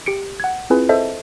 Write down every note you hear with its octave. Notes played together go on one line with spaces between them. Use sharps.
G4 C#7 D7
F#5 G#6
C4 E4 F4 G#4 B4 G#5
A4 C5 D#5 E5 A5